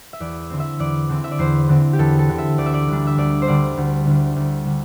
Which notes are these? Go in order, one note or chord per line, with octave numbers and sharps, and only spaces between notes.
E5
E2 D5
D3 C4
E5
E2 D5
D3 C4
E5
D5
E2 C5
D3 C4
G4
E2 A4
A4
D3 C4
E5
D2 D5
E5
D5
D3 G3 D4
E5
D2 D5
C5
D3 G3 D4 D5
D2
D3 G3 D4
D2
D3 G3 D4